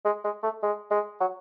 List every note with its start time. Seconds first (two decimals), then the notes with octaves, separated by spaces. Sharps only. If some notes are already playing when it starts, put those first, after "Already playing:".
0.05 G#3
0.24 G#3
0.43 A3
0.63 G#3
0.91 G#3
1.21 F#3